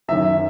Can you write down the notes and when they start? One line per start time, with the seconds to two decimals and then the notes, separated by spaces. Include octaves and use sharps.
0.08 F#2 D#3 F#3 E5